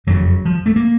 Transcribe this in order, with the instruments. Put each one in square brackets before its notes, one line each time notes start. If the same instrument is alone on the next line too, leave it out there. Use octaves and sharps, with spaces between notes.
[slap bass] F#1 F2 C#3 F#3
F3
A3
A#3